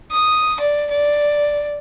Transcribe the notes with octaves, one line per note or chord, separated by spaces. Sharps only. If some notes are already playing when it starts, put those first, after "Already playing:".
D#6
D5
D5